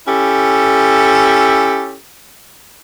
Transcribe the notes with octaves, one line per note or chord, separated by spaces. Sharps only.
C#4 E4 G4 A4